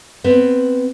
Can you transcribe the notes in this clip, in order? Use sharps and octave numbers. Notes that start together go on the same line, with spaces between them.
B3 C4